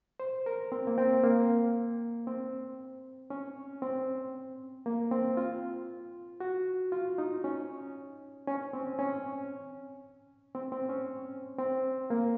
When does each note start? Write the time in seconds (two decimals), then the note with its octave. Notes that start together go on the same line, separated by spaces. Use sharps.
0.20 C5
0.46 A#4
0.72 C4
0.87 A#3
0.98 C4
1.24 A#3
2.27 C4
3.30 C#4
3.82 C4
4.86 A#3
5.12 C4
5.37 F4
6.40 F#4
6.92 F4
7.18 D#4
7.44 C#4
8.47 C#4
8.73 C4
8.99 C#4
10.55 C4
10.72 C4
10.89 C#4
11.59 C4
12.10 A#3